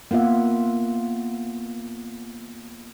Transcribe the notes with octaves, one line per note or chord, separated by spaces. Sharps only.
A#3 B3 F4 E5 F#5